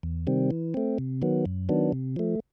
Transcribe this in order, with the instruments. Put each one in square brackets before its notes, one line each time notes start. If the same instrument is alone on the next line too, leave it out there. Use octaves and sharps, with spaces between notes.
[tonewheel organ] E2
C3 D#3 G3 C4
E3
A3 C4
C3
D#3 F#3 B3
F#2
D#3 F#3 B3 D4
C3
F3 A3